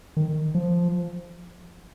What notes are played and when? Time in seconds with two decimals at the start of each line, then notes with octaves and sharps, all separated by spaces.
0.17 D#3
0.55 F3